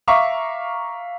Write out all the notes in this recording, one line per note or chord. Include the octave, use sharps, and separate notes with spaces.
E5 F5 A#5 C#6 D6